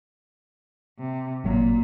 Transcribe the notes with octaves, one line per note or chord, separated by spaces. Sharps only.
C3
G#1 A#2 F#3